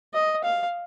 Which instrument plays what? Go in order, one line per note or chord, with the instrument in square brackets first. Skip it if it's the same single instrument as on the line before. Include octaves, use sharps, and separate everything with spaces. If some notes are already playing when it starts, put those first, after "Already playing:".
[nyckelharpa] D#5
F5